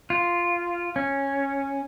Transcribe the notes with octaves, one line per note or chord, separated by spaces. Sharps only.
F4
C#4